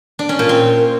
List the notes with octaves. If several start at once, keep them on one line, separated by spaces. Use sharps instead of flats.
D4
C#4
A#2
C4